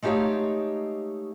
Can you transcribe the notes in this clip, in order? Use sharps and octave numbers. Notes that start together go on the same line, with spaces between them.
G#3 A3 D#4 G4 C#5 F5